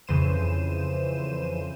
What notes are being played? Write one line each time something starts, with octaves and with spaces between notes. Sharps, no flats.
F2 C#3 E3 C5 D#7 E7